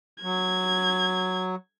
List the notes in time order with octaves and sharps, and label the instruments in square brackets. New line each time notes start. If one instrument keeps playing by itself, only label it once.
[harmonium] F#3 [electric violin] G#6